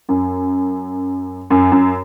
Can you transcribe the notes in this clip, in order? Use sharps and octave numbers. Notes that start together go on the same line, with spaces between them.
F#2
F#2
F#2